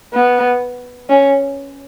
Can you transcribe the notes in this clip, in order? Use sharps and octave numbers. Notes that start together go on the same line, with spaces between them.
B3
C#4